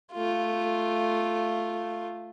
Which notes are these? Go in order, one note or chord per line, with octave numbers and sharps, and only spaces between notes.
A3 F4